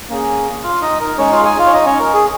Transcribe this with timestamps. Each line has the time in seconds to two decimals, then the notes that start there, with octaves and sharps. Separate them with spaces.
0.09 A#3 C#4 G#4
0.63 F4 F5
0.82 D#4 D#5
1.01 A#4
1.18 G#3 C#4 D#4 G#4 C#5
1.32 F4 F5
1.45 G#4 G#5
1.59 F4 F5
1.67 C#5
1.73 D#4 D#5
1.86 C#4 C#5
2.00 A#4
2.14 G#4